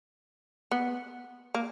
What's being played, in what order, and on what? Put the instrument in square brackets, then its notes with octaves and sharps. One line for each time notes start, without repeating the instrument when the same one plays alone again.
[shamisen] B3
A#3